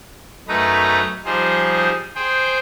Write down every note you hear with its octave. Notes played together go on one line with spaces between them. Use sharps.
F#2 A3 D#4 B4 A#5
F3 G3 D#4 G#4 C5
G#4 C5 G5